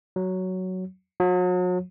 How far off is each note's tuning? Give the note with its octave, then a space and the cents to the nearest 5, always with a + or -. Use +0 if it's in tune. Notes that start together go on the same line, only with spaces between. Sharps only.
F#3 +5
F#3 -40